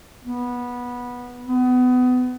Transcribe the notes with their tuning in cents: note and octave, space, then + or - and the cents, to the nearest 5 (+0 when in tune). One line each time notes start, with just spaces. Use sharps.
B3 -15
B3 +25